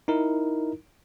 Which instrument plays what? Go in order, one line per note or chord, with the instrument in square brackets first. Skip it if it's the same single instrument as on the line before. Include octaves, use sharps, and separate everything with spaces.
[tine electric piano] D#4 E4 A#4